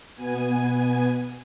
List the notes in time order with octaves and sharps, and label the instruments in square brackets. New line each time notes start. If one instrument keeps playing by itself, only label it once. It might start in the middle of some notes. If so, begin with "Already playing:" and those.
[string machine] B2 B3 G#5